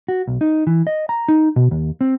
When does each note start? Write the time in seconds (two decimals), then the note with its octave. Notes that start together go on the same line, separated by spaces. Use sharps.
0.08 F#4
0.27 B1
0.41 D#4
0.67 E3
0.87 D#5
1.09 A#5
1.28 D#4
1.56 B2
1.71 D#2
2.01 C4